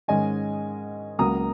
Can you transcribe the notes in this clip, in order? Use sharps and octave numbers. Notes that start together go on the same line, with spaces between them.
G#2 D#3 G#3 C#4 D#5 G#5
C#2 C#3 F#3 A#3 A#5 D#6